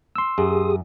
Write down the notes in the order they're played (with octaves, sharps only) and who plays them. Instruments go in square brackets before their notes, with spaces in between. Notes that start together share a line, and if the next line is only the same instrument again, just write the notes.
[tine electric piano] C6 E6
[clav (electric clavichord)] F#2 [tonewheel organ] G4 G#4 D#6